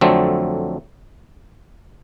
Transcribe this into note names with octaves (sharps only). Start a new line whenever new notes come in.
F2 D3 F#3 A3 C4